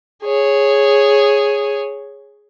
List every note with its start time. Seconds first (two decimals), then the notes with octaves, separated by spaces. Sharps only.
0.23 G#4 C#5